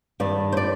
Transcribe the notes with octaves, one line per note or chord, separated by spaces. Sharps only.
G2 D#3 D5
C5
D5